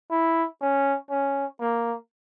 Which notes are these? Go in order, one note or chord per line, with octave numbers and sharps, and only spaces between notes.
E4
C#4
C#4
A#3